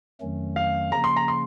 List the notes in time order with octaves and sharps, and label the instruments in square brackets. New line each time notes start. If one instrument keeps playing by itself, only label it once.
[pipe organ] F2 D#3 F#3 A3 C#4
[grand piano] F5
[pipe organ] C#3 F3 A#3 C#4 [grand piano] A#5
[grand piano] C6
A#5
C6